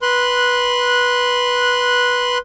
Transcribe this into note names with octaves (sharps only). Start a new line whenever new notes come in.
B4 C6 F#6